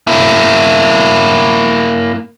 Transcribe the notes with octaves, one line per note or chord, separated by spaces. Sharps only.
A#3 E4